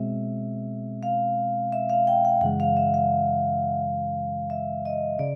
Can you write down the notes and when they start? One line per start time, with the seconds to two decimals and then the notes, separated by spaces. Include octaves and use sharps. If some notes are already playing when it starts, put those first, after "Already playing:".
Already playing: B2 G#3 C4 E5
1.03 F5
1.72 E5
1.90 F5
2.07 G5
2.25 F#5
2.41 F#2 C#3 E3 G#3 F#5
2.60 F5
2.77 E5
2.94 F5
4.50 E5
4.85 D#5
5.19 C#3 D5